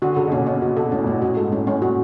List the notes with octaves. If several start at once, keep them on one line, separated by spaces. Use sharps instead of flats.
D3 F#4
C#3 A4
B2
A#2 C#4
B2 C#4
B2 F#4
B2 A4
A2 C#4
A#2
A2 C#4
A2 F#4
G#2 A4
A2 C#4
A2 C#4
A#2 F#4